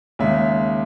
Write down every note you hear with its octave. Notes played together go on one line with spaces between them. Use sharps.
D#2 C#3 G#3 E5